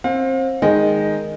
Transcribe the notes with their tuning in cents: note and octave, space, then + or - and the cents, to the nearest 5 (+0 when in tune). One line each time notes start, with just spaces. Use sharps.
C4 +25 F5 +35
D#3 +0 G#3 +0 D#5 -15